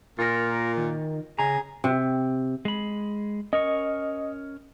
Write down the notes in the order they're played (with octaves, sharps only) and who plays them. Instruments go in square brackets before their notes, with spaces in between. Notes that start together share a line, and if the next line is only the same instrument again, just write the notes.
[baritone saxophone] A#2 [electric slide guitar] F4 A#4
[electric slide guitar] D#3
[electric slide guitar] C#3 A#5 [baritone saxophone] G#4
[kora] C3
[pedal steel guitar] G#3 B5
[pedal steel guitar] C#4 A#4 C#6 [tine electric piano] D#5